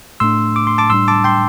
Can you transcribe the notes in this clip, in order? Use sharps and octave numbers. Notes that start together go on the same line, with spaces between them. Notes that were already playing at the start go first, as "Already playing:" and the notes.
A2 A3 D4 C6 E6
D6
C6
A5 D6
A2 G3 D4 C6 E6
A5 D6
G5 C6